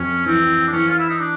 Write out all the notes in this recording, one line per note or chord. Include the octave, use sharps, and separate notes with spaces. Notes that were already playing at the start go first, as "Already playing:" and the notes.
Already playing: F2 C#4
E3 C4
D4
E3 C#4
F4
E4
D#4
D4